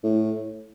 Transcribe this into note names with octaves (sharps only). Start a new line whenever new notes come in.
A2